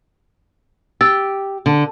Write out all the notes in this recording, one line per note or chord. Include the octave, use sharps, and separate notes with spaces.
G4 E6 A6
D3